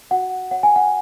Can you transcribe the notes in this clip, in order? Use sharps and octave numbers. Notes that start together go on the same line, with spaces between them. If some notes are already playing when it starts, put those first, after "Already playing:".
F#4 F#5
C#5 F#5
G#5
F#5